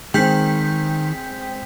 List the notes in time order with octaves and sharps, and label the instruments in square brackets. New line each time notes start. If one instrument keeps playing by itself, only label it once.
[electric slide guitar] D#3 [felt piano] G#3 C4 [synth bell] G5 G6 B6